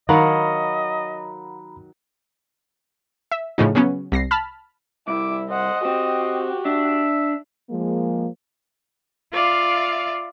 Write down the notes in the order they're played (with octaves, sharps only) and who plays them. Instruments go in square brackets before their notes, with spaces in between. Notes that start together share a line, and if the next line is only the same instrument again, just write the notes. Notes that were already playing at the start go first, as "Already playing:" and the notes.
[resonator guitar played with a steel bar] D#3 F#3 [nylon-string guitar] A#4 F5 F#5 [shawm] D#5 [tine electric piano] A#5 B5
[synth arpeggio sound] E5
A2 C#3 F3 D#4
C#3 F#3 B3 C#4
C2 A#6 C7
A5 B5 F6
[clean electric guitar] C2 [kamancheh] E4 [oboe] D6
[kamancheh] C5 F#5 [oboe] D#5
[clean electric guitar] C4 [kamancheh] F#4 G4
[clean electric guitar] D4 [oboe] E5
[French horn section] F3 G#3 A#3
[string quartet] F4 D5 E5 F5